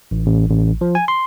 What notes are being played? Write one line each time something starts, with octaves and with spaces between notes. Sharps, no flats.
A1
A1
A1
F3
G#5
C6